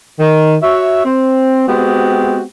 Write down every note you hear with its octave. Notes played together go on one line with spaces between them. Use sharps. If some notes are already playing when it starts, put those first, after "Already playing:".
D#3
F#4 C#5 E5
C4
G#3 B3 C4 F#4 G4